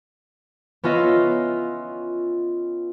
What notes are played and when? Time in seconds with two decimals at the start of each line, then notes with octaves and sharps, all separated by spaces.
0.84 B3 C#4 F4 D#5 E5